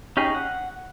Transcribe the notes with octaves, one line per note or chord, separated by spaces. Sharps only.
C#4 D#4 G4 G#4
F#5